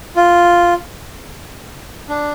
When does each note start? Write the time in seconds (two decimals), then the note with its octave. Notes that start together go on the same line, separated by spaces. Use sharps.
0.16 F4
2.09 D4